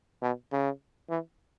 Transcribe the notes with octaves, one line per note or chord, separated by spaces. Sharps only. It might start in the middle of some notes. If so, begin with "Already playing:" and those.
B2
C#3
E3